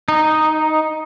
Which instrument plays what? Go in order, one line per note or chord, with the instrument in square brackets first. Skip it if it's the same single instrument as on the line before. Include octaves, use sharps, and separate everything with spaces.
[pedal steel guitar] D#4